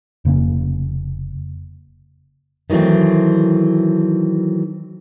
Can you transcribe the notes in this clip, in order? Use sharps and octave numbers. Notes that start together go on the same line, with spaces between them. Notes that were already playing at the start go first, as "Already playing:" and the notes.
F1 C#3 A#3 C#4
D#3 E3 F#3 A3 C4